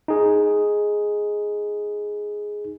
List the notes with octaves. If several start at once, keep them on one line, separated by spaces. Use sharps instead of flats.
D#4 G#4